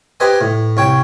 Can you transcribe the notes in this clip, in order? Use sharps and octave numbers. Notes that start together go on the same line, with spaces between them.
G4 B4 C5 D#5 G#5
A2
C2 C#5 G5